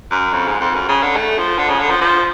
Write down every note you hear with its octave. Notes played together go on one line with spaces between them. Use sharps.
F#2
F2
G#2
F2
F#2
C#3
D3
A3
F3
D3
C#3
D3
F3
F3